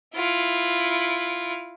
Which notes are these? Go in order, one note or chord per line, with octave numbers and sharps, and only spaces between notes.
E4 F4